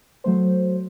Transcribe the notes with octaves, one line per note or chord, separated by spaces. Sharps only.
F#3 A3 C5